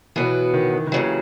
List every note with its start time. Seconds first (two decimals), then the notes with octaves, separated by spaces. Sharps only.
0.16 B2 E3 F#3 B3
0.54 D#3
0.73 D#3
0.87 D#3
0.92 D#2 C#3 E3 F#3